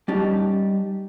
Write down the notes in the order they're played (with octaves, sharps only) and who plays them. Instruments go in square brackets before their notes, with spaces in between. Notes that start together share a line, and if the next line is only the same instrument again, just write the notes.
[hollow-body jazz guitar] G3 C#4 D#4 G4 A5